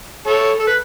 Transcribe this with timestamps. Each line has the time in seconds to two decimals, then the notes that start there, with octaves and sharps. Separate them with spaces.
0.27 A4 C#5
0.60 A4
0.68 B4